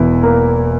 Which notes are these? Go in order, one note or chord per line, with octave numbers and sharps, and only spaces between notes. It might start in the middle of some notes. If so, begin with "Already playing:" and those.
Already playing: E1 E2 E3 E4
A#3